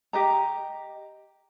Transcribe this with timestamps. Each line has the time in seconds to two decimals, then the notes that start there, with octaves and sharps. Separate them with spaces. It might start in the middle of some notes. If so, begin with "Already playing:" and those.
0.13 G4 D#5 A#5